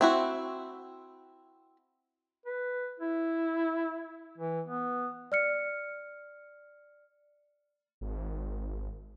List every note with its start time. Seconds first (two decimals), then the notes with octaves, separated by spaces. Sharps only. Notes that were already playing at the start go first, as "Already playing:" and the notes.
0.01 C4 E4 F#4
2.46 B4
3.00 E4
4.38 E3
4.67 B3
5.32 D5 F6 C#7
8.01 G#1